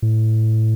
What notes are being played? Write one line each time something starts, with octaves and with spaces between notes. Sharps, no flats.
A2